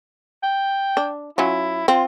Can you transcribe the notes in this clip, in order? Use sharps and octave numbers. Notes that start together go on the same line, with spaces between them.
G5
D4
F#3 C#4 E4 F4
C4 F4